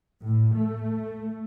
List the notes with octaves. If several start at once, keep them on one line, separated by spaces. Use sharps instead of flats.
A2
A3